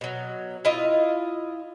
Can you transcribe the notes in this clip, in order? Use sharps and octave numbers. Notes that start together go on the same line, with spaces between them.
B2 F#3
E4 F4 D#5